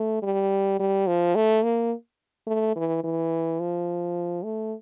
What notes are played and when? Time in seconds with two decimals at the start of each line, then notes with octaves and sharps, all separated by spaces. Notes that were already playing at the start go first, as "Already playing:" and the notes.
Already playing: A3
0.23 G3
0.79 G3
1.07 F3
1.35 A3
1.63 A#3
2.47 A3
2.76 E3
3.04 E3
3.60 F3
4.44 A3